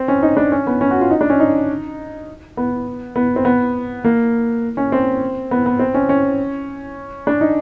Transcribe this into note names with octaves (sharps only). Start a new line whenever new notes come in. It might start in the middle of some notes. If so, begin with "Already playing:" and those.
Already playing: C4
C#4
D#4
D4
C#4
B3
C#4
F#4
F4
D#4
D4
C#4
D#4
B3
B3
C4
B3
A#3
C#4
C4
B3
B3
C4
C#4
C#4
D4
D#4